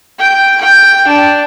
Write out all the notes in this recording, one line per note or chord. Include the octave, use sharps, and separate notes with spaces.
G5
G5
D4